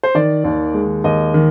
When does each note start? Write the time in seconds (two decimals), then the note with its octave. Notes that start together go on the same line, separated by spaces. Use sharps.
0.03 C5
0.15 D#3 D5
0.44 D#2
0.74 G#3
1.04 D#2 D#5
1.34 D#3